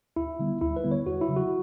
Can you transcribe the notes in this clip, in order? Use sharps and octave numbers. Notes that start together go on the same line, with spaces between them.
D2 E4
D3 G3 B3
D2 E4
B4
D3 G3 B3
C#5
E2 F#4
E4
C#3 F#3
F#4